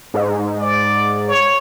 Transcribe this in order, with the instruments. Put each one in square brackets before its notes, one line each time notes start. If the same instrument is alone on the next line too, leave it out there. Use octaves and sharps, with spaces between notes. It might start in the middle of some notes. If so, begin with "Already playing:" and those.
[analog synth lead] G#2
[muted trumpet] D5
C#5